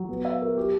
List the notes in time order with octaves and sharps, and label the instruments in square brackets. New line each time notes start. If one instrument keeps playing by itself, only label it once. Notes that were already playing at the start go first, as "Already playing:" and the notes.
Already playing: [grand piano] F#3
B3
E5
A#4
G4